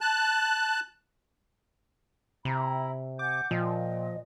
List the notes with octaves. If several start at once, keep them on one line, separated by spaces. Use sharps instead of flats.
A5 F#6
C3 E4 A#5 B5
F#5 G#5 D6 G6
A#2 F3 D#5 G5